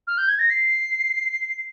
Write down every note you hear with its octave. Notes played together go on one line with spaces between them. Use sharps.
F6
G6
G#6
A#6
C7